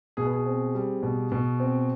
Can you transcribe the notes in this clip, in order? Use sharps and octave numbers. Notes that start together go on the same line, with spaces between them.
B2 G#4
B4
G#4
C4
G3
B2
B2
C4